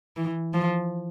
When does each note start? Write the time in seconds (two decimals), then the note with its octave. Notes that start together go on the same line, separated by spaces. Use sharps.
0.16 E3
0.54 F3